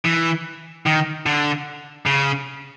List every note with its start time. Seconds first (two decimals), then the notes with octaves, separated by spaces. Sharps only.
0.05 E3
0.86 D#3
1.26 D3
2.07 C#3